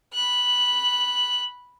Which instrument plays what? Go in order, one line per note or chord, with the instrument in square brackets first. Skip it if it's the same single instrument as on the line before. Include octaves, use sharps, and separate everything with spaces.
[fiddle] B5 F#6